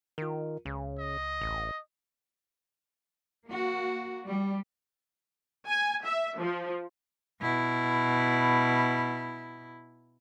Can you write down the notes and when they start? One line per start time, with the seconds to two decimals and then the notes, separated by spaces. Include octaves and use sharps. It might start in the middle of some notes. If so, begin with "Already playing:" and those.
0.18 D#3 F4 A#4
0.65 C#2 C#3
0.99 D#5
1.41 A1
3.48 A#3 F#4
4.27 G3
5.68 G#5
6.05 E5
6.40 F3
7.41 B2 E4